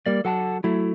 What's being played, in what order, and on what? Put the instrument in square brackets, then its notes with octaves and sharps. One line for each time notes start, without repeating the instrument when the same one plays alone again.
[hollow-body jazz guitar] G3 A#3 [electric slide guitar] D5
[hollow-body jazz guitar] F#3 [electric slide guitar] A4 F#5 A5
[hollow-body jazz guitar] F#3 A3 [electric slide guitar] E4